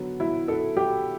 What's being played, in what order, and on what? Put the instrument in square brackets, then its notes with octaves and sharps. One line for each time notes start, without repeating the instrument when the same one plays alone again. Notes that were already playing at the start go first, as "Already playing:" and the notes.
Already playing: [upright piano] D3 F#3 B3
[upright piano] F#3 [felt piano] E4
[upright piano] F#4 [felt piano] A4
[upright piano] F#3 [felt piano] G4